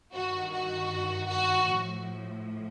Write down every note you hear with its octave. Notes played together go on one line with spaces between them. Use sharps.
G2 D#3 F#4
F#4
F#4
A2 F3